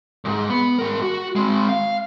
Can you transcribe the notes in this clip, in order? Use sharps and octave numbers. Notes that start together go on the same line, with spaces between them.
C2 G#2
B3
G#2 A#4
F#4
G#3 C4
F5